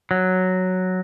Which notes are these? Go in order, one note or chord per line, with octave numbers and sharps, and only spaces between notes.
F#3